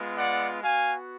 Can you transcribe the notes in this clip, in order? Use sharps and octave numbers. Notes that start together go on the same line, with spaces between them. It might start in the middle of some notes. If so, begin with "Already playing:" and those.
Already playing: G#3 B3 F4
D5 F#5
B3 F#4 F5 G#5